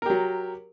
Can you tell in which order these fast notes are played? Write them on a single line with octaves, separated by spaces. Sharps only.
A#4 G4 F#3